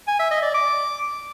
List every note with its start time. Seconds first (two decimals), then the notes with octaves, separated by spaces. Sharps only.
0.08 G#5
0.19 E5
0.31 D#5
0.43 D5
0.54 D6